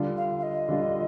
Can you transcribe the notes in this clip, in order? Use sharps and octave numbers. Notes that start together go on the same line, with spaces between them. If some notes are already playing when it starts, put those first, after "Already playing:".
Already playing: D3 G3 D4 F4
F5
F5
D#5
D3 G3 D4 F4